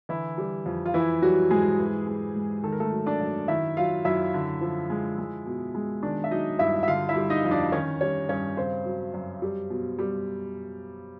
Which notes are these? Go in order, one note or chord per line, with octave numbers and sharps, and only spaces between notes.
D3 E3 E4
G3
F2
F4
E3 E4
F#3 G3 F#4
G#2 G#3 G#4
E3
G#3
G#2
D#3 A4
A#4
A3 A4
F#3
D4 D5
F#2
D#3 E4 E5
F#3 F4 F5
F#2 E4 E5
D3
F3
G#3
G#3
B2
G#3
D#3 D4 D5
E5
F#3 D#4 D#5
G2 E4 E5
E5
D3 F4 F5
E4 E5
G3
D#4 D#5
F2
D4 D5
D#3 C#4 C#5
G3 C#4 C#5
G2 C#4 C#5
C#3 C4 C5
F#3
F#2
G3
B2
G3